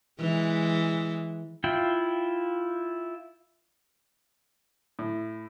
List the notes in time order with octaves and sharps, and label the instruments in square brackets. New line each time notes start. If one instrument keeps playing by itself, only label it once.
[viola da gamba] E3 G#3
[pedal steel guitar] E4 F4 G5
[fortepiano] A2